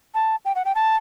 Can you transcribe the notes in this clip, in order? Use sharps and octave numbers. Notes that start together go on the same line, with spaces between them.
A5
G5
F#5
G5
A5